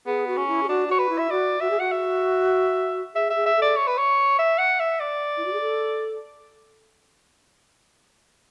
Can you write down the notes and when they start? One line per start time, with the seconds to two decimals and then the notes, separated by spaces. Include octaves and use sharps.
0.06 B3 G#4
0.27 F#4
0.37 C#4
0.48 E4
0.63 G#4
0.68 D4 F#4
0.88 F#4 C#5
0.99 B4
1.09 E4
1.18 E5
1.30 F#4 D5
1.60 F#4 E5
1.70 G#4
1.79 F#4 F#5
1.91 E5
3.15 G#4 E5
3.30 E5
3.36 G#4
3.46 E5
3.56 A4
3.62 D5
3.76 C#5
3.87 B4
3.97 C#5
4.39 E5
4.58 F#5
4.79 E5
5.00 D5
5.37 E4
5.45 F#4
5.53 G#4
5.61 A4